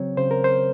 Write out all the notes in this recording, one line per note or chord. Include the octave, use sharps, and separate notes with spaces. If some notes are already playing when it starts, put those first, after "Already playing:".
Already playing: C#3 F#3 C4 C#5
C#3 C5
A#4
C5